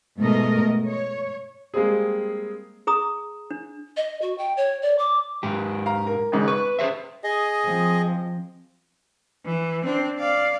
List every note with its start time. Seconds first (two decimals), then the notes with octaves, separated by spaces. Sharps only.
0.21 G#2 B2 A3 A#4 D#5
0.88 C#5
1.74 G3 G#3 A#3 C4 G#4
2.87 G#4 A#5 D#6
3.51 D4
3.96 D#5
4.21 F#4
4.38 G5
4.57 C#5
4.82 D5
4.98 D6
5.43 G#2 G4
5.86 F5 A#5
6.07 A#4
6.32 G#1 G#2 C#3
6.48 B4 C#6
6.79 G#4 C5 E5
7.24 G#4 D#5
7.65 F3 C4
9.45 E3
9.84 C4 D4
10.18 D5 F5